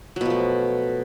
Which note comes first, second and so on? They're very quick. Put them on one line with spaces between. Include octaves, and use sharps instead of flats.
F#3 B2 F3 A3